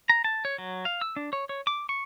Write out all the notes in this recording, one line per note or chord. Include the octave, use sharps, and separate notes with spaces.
A#5
A5
C#5
F#3
F5
E6
D4
C#5
C#5
D6
C#6